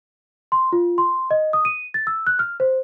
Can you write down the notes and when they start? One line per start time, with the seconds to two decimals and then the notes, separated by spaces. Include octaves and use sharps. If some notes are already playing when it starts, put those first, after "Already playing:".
0.52 C6
0.73 F4
0.98 C6
1.31 D#5
1.53 D#6
1.65 D#7
1.94 A6
2.07 E6
2.27 F#6
2.39 F6
2.60 C5